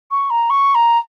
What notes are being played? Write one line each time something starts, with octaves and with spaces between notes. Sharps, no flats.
C#6
A#5
C#6
A#5